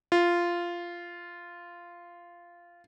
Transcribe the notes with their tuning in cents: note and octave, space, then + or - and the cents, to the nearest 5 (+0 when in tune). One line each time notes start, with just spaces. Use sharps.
F4 -10